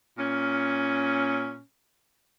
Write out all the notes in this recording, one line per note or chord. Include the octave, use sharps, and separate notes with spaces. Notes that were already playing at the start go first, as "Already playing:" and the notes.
A#2 C#4